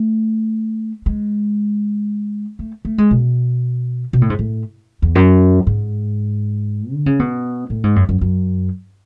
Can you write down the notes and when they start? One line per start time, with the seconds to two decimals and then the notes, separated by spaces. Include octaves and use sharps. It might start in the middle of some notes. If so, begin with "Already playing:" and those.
Already playing: A3
1.06 G#3
2.59 A3
2.85 A3
2.98 G#3
3.11 B2
4.13 B2
4.21 A2
4.30 G#2
4.39 A2
5.02 E2
5.15 F#2
5.67 G#2
6.92 D3
7.06 C#3
7.19 B2
7.70 A2
7.83 G#2
7.96 F#2
8.09 F#2
8.21 F#2